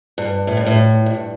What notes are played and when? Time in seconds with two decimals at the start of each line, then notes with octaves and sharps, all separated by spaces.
0.18 G2
0.47 A2
0.57 G2
0.66 A2
1.06 G2